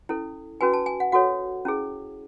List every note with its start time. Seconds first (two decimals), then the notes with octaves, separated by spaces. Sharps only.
0.09 C#4 E4 A4
0.61 C#4 F#4 B4 G#5
0.73 A5
0.86 G#5
1.00 F#5
1.12 F#4 A4 C#5 F#5
1.65 C#4 E4 G#4